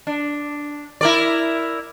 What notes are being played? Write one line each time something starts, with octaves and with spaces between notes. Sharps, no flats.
D4
E4 A#4 D5